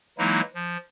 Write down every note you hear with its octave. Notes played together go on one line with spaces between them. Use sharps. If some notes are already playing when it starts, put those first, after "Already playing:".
E3 F#3 G#3 A#3 D#4 E4
F3